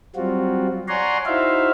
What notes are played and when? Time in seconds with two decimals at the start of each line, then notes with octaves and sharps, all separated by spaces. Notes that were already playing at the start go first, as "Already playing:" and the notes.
0.16 F#3 G3 C4 F4 F#4
0.88 C#5 D5 F#5 G#5 A#5 C6
1.26 D#4 E4 F#4 C5 E5 F5